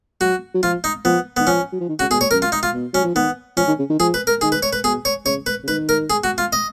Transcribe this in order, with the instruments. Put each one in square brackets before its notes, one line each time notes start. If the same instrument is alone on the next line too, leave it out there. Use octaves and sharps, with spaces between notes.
[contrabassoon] F#3 [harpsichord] F#4
[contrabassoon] F#3
[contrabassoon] F3 [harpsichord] F4
[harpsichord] D#4
[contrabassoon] F3 [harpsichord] B3
[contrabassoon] D#3 [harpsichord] B3
[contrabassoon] F3 [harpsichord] C#4
[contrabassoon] F#3
F3
D#3
[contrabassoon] C#3 [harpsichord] F#4
[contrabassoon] B2 [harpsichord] G#4
[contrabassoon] A#2 [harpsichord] C#5
[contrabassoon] F#2 [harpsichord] A#4
[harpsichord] F4
D#4
F4
[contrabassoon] B2
[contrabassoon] F#3 [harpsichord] C#4
[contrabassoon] F3
[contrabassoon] D#3 [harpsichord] B3
[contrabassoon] F3 [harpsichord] C#4
[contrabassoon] D#3
C#3
D#3
[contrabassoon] F3 [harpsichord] G#4
[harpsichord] B4
A#4
[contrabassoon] D#3 [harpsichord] G#4
[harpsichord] B4
C#5
B4
[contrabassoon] B2 [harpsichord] G#4
[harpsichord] C#5
[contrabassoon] C#3 [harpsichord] C#5
[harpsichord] B4
[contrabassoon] C#3
[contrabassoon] D#3 [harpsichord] B4
[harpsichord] A#4
G#4
F#4
F4
D#5